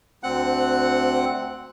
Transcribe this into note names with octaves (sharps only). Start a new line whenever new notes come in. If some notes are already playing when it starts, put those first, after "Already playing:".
D2 C4 F#5 F#6